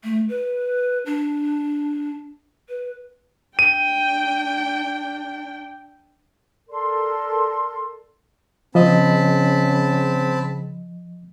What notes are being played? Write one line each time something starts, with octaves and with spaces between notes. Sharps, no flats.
A3
B4
D4
B4
D4 G5 D#7
A4 A#4 D5 C6
C#3 F3 C4 D#5 A5 B5